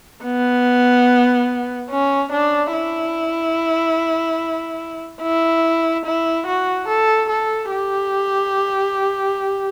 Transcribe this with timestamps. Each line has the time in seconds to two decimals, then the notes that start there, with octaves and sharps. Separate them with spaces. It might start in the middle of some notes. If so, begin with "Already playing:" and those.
0.25 B3
1.90 C#4
2.32 D4
2.73 E4
5.22 E4
6.06 E4
6.47 F#4
6.88 A4
7.30 A4
7.71 G4